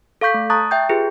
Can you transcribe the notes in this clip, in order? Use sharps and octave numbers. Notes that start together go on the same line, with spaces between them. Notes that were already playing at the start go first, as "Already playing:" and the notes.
A4 F5 C#6 G6 B6
A3
A5 A#5 C#6 D#6 F#6 A6
E5 G5 G6
F4 G4 G#4 B4